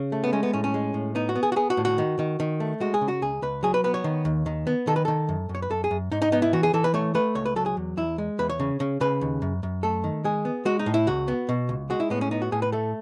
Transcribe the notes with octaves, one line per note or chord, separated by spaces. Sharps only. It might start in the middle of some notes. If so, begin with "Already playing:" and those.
Already playing: C#3
A3
B3
G#3 C#4
B3
A2 C#4
C#4
G#3
A2
B3 D#4
F#4
B3
G#4
F#4
B3 G#4
F#4
A2
F#4
D#3
D#3
D#3
A3
G#3 F#4
G#4
C#3
F#4
C#2 G#4
C#2 B4
F#3 G#4
B4
B3 B4
C#5
D#3
D#2
D#3
B3
D#3 A4
B4
D#3 A4
F#2
F#2
C#5
B4
F#2 A4
G#4
F#2
G#2 D#4
D#4
B3 D#4
E4
E3 F#4
G#4
E3 A4
B4
A3 C#5
A3 B4
C#2 C#5
B4
F#3 A4
G#4
E2
E2 E4
G#3
E2 B4
C#5
C#3
C#3
C#3 B4
D#2
F#2
F#2
A3 A4
D#3
G#3 G#4
B3
G#3 F#4
D#4
A2
E4
C#2 F#4
B3
B2
C#2
G#3 F#4
E4
A2 B3
C#4
B3 D#4
F#4
A2 G#4
B4
A3 A4